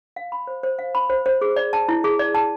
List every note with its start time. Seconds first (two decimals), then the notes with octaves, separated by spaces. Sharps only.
0.16 F5
0.32 B5
0.47 C5
0.63 C5
0.79 F5
0.95 B5
1.10 C5
1.26 C5
1.41 G#4
1.56 D5
1.73 A5
1.89 E4
2.04 G#4
2.19 D5
2.34 A5